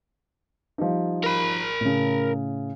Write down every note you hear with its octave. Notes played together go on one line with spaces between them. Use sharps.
F3 G3 D#4
A#4 B5
A2 C#3